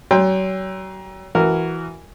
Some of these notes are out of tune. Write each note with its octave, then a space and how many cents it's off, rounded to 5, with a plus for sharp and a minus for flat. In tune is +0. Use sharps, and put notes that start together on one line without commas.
F#3 +35 G5 +25 C6 +0
E3 +0 F#4 +0 A#4 -10